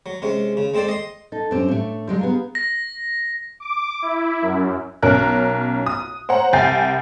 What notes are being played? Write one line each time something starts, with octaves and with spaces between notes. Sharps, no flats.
F#3
C3 G#3 C#4
C#3
G#3 C4 A4 C5 D5
D#5 C6
D#4 A4 A5
F#2 C4 D4 G4
A2 A3
D3 F#3 G#3 G4
B3 G#4 F5 A#5
A#6
D6
E4
F#2
B1 C#4 A#4 F#6
D#6
C5 C#5 F#5 A#5
C2 G5 G#5 G6 A6 C7